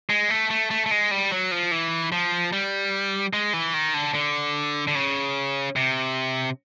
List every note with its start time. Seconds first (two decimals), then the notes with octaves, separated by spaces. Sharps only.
0.10 G#3
0.30 A3
0.50 A3
0.71 A3
0.86 A3
0.91 G#3
1.11 G3
1.31 F#3
1.52 F3
1.71 E3
2.12 F3
2.53 G3
3.33 G#3
3.53 E3
3.74 D#3
3.94 D3
4.14 D3
4.88 D3
4.95 C#3
5.76 C3